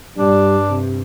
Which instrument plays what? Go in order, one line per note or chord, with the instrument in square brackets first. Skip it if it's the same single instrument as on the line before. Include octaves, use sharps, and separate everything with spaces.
[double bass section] G2 [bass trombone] G3 [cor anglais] D4
[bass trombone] C3